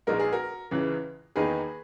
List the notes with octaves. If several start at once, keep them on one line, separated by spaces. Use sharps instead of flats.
A#1 A#2 G#3 D#4 A#4
G#4
F#4 A#4
C#2 C#3 E3
E2 D#3 A#3 D#4 G#4 B4